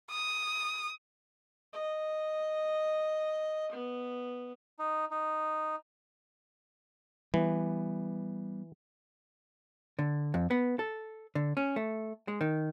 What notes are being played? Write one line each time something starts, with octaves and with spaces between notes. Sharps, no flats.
D#6
D#5
B3
D#4
D#4
E3 G3 B3
D3
F2
B3
A4
D3
C#4
A3
G#3
D#3